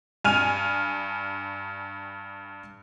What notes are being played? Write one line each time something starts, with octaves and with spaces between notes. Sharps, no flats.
G2 G#5 F6 D#7